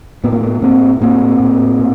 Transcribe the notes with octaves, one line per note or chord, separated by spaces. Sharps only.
A2 B3
A#3
A3 B3
A2 A#3 C4
A2 A#3 C4
A2
A#2